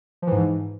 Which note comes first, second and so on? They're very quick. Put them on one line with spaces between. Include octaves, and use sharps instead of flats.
F3 E3 G#2